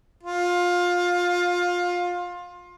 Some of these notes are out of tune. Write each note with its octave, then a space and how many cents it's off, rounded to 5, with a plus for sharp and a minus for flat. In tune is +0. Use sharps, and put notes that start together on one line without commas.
F4 +20